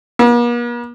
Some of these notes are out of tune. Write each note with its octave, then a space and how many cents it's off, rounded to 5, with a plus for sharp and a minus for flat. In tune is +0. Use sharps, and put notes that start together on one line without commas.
A#3 +45